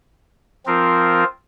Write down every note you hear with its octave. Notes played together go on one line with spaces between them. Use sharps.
F3 C4 F4 A#4